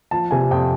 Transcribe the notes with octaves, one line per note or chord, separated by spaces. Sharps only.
F3 A5
C3 G#5
F2 G5